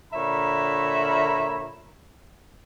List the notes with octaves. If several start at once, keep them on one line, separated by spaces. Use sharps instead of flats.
A#2 D3 C#5 E5 A#5 B5